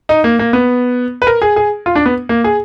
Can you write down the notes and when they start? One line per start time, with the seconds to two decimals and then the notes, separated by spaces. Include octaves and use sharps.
0.09 D#4
0.24 A#3
0.39 A#3
0.53 B3
1.22 B4
1.27 A#4
1.42 G#4
1.56 G#4
1.86 F4
1.95 D4
2.06 B3
2.29 A#3
2.44 G#4